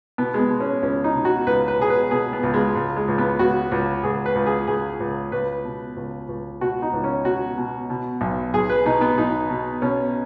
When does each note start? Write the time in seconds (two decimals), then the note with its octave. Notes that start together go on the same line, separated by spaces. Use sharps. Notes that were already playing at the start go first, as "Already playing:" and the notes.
0.18 B2 B3
0.34 G#3
0.40 B3
0.50 B2
0.60 C#4
0.83 C#2 C#4
1.04 D#4
1.15 B2
1.25 F#4
1.46 C#2 B4
1.68 B4
1.79 B2 G#4
1.90 B4
2.11 B2 G#4
2.33 B3
2.43 C#2
2.54 G#3
2.75 C#2
2.96 G#3
3.08 C#2
3.18 B3
3.39 C#2 F#4
3.71 C#2
4.03 C#2 G#4
4.26 B4
4.35 C#2
4.46 G#4
4.67 C#2 G#4
5.00 C#2
5.32 C#2 B4
5.65 B2
5.96 C#2
6.28 C#2
6.61 B2 F#4
6.82 D#4
6.93 C#2
7.04 C#4
7.25 B2 F#4
7.58 B2
7.90 B2
8.21 B1
8.53 B1 G#4
8.70 B4
8.86 B2 D#4
9.01 B3
9.18 B1 D#4
9.50 B2
9.82 B2 C#4